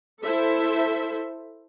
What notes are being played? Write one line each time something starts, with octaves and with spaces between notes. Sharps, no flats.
E4 A4 C5 E5